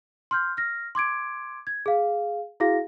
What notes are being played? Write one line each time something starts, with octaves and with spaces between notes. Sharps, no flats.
C6 F6 G6
F6 A#6
C6 D6 G#6 D7
G#6
G#4 F5
E4 F#4 G#4 F5 A#6